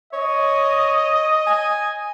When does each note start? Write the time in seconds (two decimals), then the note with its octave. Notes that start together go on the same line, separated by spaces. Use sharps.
0.13 C#5 D#5
1.47 G#5